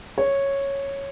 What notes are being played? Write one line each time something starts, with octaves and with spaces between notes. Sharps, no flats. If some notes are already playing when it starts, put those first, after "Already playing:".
C#5